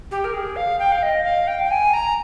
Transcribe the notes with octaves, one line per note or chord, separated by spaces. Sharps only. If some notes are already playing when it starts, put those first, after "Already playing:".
G4
A#4
G#4
F5
G5
F5
D#5
F5
G5
G5
G#5
A#5